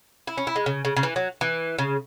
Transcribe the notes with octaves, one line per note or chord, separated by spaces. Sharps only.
E4
C#4
E4
G#3
C#3
C#3
C#3
E3
F#3
E3
C#3